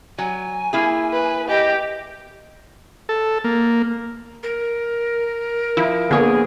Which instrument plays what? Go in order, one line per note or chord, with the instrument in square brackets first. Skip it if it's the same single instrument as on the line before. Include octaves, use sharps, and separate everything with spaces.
[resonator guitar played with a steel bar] F#3 [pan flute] G#5
[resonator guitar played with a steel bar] A#3 E4 G#4
[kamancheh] B4
[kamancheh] G4 [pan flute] D#5
[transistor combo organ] A4
A#3
[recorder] A#4
[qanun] F3 [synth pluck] E4
[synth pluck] D3 [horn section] A#3 B3 G#4 [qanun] F4 C#5